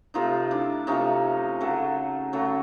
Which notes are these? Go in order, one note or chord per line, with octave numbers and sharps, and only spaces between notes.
C3 F3 A3 D#4 F4
D4 E4
C3 F3 A3 C#4 D#4
C#3 F#3 A3
C#3 F#3 A3